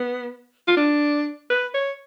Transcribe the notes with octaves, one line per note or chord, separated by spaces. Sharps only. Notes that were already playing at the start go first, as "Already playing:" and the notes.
Already playing: B3
F4
D4
B4
C#5